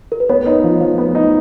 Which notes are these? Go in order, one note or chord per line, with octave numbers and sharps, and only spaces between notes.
A#4
B4
B3 C#5
D#4
F3
F3
B3
D#4